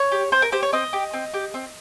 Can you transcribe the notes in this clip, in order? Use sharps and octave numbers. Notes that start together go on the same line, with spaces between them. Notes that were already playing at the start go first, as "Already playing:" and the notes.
Already playing: C#5
G4
C4 C5
A#4
G4 C5
C#5
C4 D#5
G4
C4
G4
C4